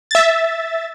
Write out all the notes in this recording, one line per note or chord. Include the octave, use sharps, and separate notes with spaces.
E5 A6